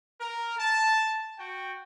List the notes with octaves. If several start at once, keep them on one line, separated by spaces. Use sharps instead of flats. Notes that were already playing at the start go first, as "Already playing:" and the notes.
A#4
A5
F#4 G5